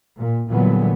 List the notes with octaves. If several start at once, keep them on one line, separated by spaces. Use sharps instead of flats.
A#2
A#2 D3 E3 F#3 G3 B3